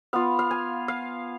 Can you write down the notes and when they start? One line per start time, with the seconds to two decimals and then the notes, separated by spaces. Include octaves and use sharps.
0.13 B3 F4 F5
0.39 F5
0.51 G#5
0.88 F5